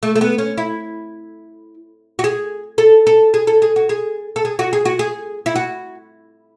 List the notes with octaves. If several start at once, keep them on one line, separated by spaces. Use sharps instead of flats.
A3
A3
B3
C#4
E4
F#4
G#4
A4
A4
G#4
A4
G#4
F#4
G#4
A4
G#4
F#4
G#4
F#4
G#4
E4
F#4